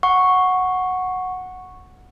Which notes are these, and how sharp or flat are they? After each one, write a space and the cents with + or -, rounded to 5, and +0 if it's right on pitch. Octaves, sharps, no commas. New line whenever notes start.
F#5 -5 C#6 -5